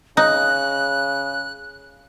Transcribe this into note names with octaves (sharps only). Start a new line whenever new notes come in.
C#3 D#4 F#6